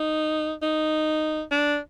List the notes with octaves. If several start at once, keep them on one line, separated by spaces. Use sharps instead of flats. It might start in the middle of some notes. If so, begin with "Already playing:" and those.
Already playing: D#4
D#4
D4